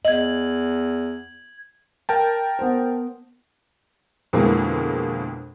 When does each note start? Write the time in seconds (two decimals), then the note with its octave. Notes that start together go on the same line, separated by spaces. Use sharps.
0.05 E2 D#5 G#6 F#7
2.09 A#4 G5 A5
2.59 B3 C5
4.33 F2 B2 D3 E3 G#3 A#3